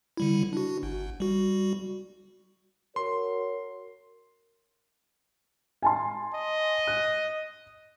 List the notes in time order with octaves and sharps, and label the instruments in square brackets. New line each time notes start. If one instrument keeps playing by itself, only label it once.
[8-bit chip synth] D3 G3 E4
D4 F#4
G1
G3 F#4
[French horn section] F#4 A#4 C#5 [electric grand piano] C6
[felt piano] G#5 A5 C6
[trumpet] D#5
[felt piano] F#6